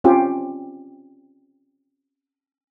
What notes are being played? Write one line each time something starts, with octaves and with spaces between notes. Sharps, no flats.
C4 C#4 F4 G4